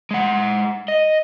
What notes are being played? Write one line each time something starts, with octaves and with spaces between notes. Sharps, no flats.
G#3 F#5
D#5